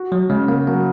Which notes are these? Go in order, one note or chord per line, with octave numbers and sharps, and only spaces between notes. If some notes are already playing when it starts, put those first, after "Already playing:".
Already playing: F#4
F#3
C#3 G#3
A#3
F#3 A#3